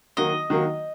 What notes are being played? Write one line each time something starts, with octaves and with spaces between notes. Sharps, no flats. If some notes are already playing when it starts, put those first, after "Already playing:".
D#3 F#3 A#3 F#4 D#5
D#3 F#3 A#3 F#4